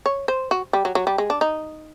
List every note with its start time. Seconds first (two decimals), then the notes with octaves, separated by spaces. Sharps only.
0.06 C#5
0.28 C5
0.51 F#4
0.73 G3
0.85 F#3
0.95 F#3
1.07 G3
1.18 G#3
1.30 D4
1.41 D#4